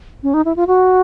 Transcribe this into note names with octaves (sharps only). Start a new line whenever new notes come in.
C#4
D#4
E4
F4
F#4